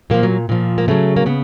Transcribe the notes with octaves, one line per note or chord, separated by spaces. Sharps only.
A#2 F3 A#3
F#3
A#2 F3
A#3
C#3 F#3 A3
A#3
C#3 B3